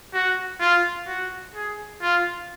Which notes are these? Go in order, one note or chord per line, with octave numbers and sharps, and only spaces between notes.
F#4
F4
F#4
G#4
F4